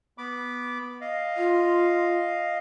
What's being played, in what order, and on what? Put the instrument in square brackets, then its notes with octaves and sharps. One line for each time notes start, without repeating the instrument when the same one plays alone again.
[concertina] B3 B5 D6
D#5 F5
[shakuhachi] F4